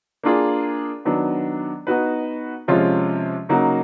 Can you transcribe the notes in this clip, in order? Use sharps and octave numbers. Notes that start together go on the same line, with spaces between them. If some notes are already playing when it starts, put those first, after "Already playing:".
A#3 D4 F4 G#4
D#3 F#3 B3 D4
B3 D#4 F#4 B4
C3 F3 G#3 C#4 F4
C#3 F#3 A#3 D#4 F#4